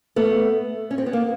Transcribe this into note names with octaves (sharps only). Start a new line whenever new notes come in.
A3 B3
C#4
C4
B3
A#3